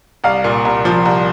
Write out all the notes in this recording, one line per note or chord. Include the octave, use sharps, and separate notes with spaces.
C2 F5
A#2
C2
F3
C2